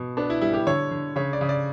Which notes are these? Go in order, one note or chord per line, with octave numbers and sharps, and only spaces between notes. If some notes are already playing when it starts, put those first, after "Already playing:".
Already playing: B2
B3 D4
E4
G3 E4
G4
D3 C#5
D3
C#3 C#5
D5
C#3
D5